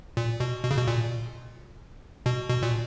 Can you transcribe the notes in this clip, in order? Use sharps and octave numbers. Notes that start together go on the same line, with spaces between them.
A#2
B2
B2
C#3
B2
A#2
B2
B2
A#2